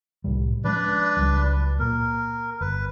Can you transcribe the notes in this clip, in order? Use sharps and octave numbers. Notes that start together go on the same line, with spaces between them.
C2 A2 G3
F3 G#3 C#4 D4 B4 D5
C#2 F#3 G3
A#2 A#4
G1 B4